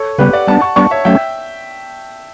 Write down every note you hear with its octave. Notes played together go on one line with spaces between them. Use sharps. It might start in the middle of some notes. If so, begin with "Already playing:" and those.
Already playing: A4 C#5
C#3 G3 B3 G4 B4
D5 F#5
G3 B3 D4 F#5 A5
A5 C#6
G3 B3 D4 A5 C#6
C#5 E5
F#3 A3 C#4 E5 G5